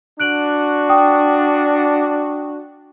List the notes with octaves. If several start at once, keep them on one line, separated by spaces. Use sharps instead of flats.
D4 F#4 F#6 D7 F#7
G5 D#6